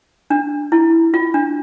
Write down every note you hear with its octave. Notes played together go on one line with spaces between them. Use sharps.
D4
E4
F4
D4